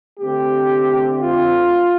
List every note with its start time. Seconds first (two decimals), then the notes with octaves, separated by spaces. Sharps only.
0.19 D3 A3 C4 G4
1.18 F4